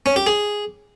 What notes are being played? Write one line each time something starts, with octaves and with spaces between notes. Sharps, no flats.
C#4
G4
G#4